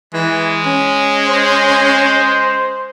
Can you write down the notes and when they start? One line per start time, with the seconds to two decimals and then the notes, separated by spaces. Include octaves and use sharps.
0.14 E3 G#3
0.66 C#4
1.26 C5